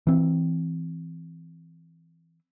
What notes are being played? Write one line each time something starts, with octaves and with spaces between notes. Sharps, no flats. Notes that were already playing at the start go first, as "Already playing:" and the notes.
E3 C4